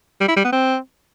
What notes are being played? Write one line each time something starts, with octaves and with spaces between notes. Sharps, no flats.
G3
E4
G3
B3
C4